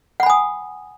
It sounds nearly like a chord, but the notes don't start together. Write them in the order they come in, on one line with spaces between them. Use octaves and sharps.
F#5 B5 G#5 D#6